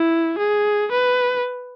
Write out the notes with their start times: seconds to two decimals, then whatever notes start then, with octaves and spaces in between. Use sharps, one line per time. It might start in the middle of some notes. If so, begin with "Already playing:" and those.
Already playing: E4
0.38 G#4
0.91 B4